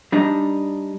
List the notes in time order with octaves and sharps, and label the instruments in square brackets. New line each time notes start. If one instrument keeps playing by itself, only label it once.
[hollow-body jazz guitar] G3 D4 D#4